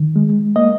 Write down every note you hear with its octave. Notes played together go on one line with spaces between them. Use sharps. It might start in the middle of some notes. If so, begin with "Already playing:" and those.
Already playing: D#3
G#3
A#3 D#5